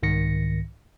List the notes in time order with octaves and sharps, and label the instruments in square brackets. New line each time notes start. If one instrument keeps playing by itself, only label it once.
[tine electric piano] C2 G#2 D#3 A#6 C#7